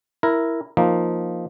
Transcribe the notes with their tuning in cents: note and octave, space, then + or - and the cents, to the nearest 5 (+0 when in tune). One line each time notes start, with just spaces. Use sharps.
E4 +0 A#4 +0
F3 +0 A#3 +0 D#4 +0